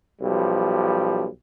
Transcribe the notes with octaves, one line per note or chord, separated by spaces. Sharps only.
B1 F3 G3